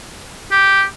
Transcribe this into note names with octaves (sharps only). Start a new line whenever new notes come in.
G4